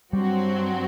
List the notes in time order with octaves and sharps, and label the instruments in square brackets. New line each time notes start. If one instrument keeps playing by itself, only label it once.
[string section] G2 F#3 C4 F#4 [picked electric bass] G3